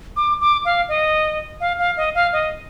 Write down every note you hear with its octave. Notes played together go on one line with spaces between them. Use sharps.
D6
D6
F5
D#5
F5
F5
D#5
F5
D#5